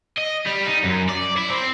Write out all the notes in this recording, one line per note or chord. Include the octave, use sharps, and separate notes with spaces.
D#5
G3
D#4
F#2
D5
E4
C4